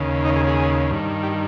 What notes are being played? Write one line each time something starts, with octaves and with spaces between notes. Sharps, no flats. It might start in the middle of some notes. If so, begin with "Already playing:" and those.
Already playing: D#2 C#3
D#4
G#4
G#4
G2 D#3
G4